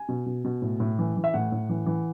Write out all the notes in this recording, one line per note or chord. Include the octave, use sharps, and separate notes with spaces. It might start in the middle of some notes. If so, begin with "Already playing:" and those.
Already playing: G#5
B2
B2
B2
A2
A2
E3
E3
E5
A2 F#5
A2
E3
E3